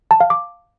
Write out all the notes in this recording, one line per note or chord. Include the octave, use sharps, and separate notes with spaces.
A5
F5
D6